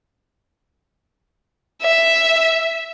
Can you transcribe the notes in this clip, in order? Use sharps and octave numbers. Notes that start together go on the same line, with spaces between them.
E5